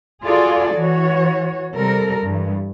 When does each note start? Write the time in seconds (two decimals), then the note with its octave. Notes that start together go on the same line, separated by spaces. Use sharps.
0.25 F4 F#4 G#4 A4 D5
0.74 E3 F#4 C#5
1.74 C3 G3 A4 A#4
2.23 G2 E3